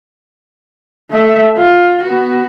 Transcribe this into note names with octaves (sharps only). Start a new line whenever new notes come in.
A3 E5
F4
B3 F#4